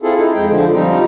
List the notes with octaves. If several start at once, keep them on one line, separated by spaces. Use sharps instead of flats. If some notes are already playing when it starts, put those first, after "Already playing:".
C4 E4 F4 G#4 A4
D#4 E4
F2 G#3 G5
D3 F3
F3 G3 C4 D#4